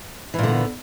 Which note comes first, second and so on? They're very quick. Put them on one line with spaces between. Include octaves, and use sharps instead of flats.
E3 A#2 D3 B3